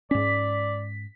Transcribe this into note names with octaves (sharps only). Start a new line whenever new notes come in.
G#2 C#4 D5 B6